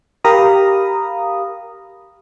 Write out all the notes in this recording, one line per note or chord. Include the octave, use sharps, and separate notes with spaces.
G4 A#4 F5 A#5 B5 D#6